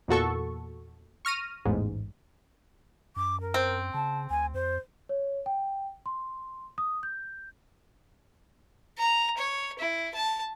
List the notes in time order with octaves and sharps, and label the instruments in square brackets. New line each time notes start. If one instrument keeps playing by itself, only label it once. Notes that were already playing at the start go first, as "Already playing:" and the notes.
[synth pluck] E2 A#2 F#4 A4 C#6
C#6 F6 A#6 D#7
A1 E2 G#2
[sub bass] F#2 [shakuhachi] D6
[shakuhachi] A#4
[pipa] C4
[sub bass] C#3 [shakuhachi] A5
[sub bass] D2 [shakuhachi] G#5
[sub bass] F2 [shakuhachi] C5
[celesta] C#5
G5
C6
D#6
G6
[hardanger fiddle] A#5
C#5
E4
A5